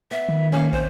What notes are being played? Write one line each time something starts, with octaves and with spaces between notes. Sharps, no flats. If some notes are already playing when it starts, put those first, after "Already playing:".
B3 E5
D#3
A#3 C#4 F5
A#1 C4 C5